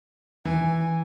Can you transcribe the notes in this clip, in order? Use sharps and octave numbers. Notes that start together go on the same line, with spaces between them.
E3 G#5